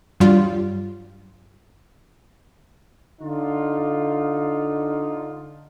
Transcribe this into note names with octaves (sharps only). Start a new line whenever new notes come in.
G2 F#3 G3 F4
D3 D#4 F4